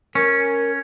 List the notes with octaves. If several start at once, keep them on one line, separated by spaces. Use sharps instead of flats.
C#4 A#4